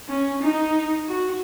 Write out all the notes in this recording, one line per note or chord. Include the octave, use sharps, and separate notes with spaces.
C#4
D#4
F#4